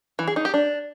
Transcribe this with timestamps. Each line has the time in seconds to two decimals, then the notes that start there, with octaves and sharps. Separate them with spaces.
0.19 E3
0.28 G#4
0.36 D#4
0.45 G4
0.54 D4